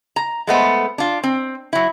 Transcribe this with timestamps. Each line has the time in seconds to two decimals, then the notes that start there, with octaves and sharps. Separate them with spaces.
0.16 A#5
0.47 G#3 A3 B3 C5
0.98 D4 F4
1.24 C4
1.73 F#3 E4